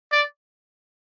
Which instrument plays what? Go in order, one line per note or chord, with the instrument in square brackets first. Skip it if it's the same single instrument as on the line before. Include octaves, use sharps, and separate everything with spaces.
[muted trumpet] D5